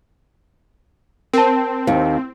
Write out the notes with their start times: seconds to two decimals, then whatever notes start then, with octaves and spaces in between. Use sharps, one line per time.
1.33 C4 A#4 A5
1.87 D#2